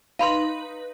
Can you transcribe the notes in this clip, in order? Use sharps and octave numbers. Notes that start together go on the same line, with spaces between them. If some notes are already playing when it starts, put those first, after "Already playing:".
D#4 B4 F5 B5 C6